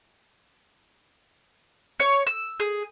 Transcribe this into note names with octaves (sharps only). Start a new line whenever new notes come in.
C#5
E6
G#4